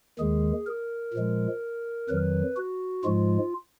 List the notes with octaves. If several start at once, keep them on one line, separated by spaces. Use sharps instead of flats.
D#2 D#3 G#3 G#4
A#4
A#2 F3 G#3
F2 D#3 F#3 B4
F#4
G#2 F3 G#3 F4